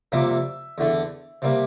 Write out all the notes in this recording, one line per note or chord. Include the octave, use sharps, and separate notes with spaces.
F2 C3 G3 A#3 E5
E2 D3 A3
C3 G3 A#3